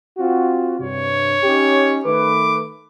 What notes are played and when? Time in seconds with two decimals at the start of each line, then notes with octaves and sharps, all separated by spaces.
0.18 C4 F4 F#4
0.80 G2 C3 C#5
1.44 C#4 D#4 G4
2.05 D#3 A3 B4 D6